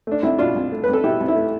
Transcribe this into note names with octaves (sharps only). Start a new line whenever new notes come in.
A3 D4
C2 E4
B2 D4 F4
C2
A3
C2 B4
A4
B2 E4 G4
C2
E4
A3